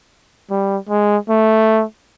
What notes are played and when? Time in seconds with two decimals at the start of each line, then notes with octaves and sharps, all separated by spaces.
0.50 G3
0.89 G#3
1.29 A3